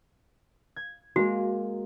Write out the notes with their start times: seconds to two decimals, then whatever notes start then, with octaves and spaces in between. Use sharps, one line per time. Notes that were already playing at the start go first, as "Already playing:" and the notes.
0.76 G#6
1.16 G#3 A#3 F#4